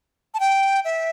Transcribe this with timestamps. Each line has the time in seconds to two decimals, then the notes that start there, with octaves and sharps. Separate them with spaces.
0.34 A5
0.40 G5
0.85 E5